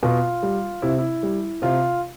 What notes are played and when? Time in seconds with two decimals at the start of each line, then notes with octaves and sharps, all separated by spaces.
0.03 B2 F4
0.43 G3
0.82 C3 E4
0.99 E4
1.23 G3
1.62 C3 F4